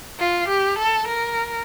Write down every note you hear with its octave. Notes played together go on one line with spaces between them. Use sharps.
F4
G4
A4
A#4